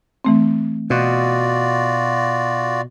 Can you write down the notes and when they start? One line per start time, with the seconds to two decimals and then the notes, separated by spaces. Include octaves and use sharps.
0.25 E3 A3 C4
0.90 B2 F4 F#4 D5